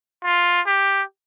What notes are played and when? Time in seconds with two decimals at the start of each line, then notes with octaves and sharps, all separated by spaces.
0.24 F4
0.66 G4